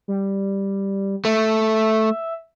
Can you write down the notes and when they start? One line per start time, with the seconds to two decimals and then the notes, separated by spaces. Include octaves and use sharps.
0.08 G3
1.25 A3 E5